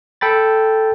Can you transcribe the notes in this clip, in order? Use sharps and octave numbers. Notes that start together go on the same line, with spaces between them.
A4 G5 B5 A6